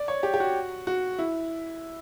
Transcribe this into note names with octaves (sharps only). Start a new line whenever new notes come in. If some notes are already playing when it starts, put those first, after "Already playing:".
Already playing: D5
C#5
G4
G4
F#4
F#4
E4